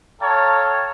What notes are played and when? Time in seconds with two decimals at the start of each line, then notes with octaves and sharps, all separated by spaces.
0.21 A4 C#5 F5 G5 A5 A#5